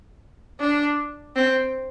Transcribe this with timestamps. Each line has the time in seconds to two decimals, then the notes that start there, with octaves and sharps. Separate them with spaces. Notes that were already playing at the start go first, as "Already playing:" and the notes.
0.60 D4
1.36 C4